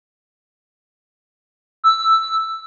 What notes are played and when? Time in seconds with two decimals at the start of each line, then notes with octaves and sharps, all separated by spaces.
1.84 E6